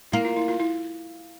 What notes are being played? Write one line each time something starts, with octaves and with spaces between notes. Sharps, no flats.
A#3 E4
F4
E4
F4
E4